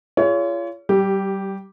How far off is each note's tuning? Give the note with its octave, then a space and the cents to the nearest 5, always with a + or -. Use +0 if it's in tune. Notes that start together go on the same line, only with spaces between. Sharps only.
F4 -30 G#4 +0 C#5 +30
G3 -25 G4 +0